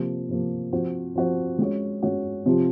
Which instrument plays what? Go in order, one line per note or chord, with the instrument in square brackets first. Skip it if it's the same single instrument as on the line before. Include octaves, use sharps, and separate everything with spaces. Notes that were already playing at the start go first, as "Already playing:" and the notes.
Already playing: [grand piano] C3 F3 A#3
C3 F3 A#3
F3 C4 F#4 C5
F3 C4 F#4 C5
G#3 C#4 F#4 C#5
G#3 C#4 F#4 C#5
C3 F3 C4 F4